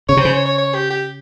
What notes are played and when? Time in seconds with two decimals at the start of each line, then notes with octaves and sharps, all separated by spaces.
0.09 C#3 C#5
0.17 C3
0.20 C#3 C5
0.33 C#5
0.46 C#5
0.58 C#5
0.74 G4
0.90 G4